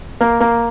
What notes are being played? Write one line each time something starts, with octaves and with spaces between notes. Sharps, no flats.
A#3
A#3